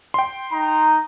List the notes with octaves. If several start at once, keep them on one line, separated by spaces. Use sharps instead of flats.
G5 C6
D#4 A#5